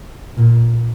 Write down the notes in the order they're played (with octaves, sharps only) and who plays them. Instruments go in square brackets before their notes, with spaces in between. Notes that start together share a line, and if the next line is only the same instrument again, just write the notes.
[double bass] A#2